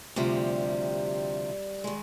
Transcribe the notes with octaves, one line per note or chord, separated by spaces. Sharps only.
D2 C3 F3 G3
D#3 G#3